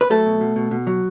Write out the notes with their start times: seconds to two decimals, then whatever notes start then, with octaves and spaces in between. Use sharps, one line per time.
0.01 B4
0.10 F#3 A3 A4
0.26 B2
0.41 B2
0.56 B2
0.71 B2
0.87 F#3